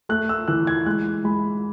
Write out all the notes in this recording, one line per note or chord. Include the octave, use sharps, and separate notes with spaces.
A3 F#6
E6
E3 F#6
G#6
G#3 F#6
G#3 B5